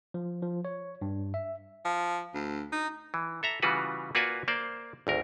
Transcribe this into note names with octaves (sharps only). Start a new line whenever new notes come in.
F3
F3
C#5
G2
E5
F3
D2
D#4
E3
A4 E5 A#5
C#3 E3 G3 F4 F#4 B4
A#3 F4 F#4 B4 D5 G#5
A#3 C5 D5
G#1 D2 A#4